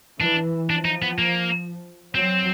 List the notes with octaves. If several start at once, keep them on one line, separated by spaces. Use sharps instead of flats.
E3 D4
F3 D4
D#4
B3
A#3
F#3 C4